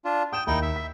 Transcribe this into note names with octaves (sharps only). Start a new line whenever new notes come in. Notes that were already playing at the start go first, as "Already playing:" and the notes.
D4 F4
G5 D#6 G6 E7
D#2 D#4 E4 G5
E5
B6